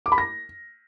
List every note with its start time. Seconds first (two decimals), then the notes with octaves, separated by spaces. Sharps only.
0.06 D6
0.12 B5
0.18 A#6